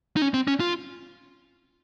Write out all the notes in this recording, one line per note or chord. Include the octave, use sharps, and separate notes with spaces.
D#4
C#4
C4
C#4
F4